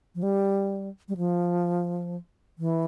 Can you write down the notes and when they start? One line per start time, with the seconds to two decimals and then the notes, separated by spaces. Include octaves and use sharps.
0.15 F3
0.23 G3
1.08 G3
1.17 F3
2.59 E3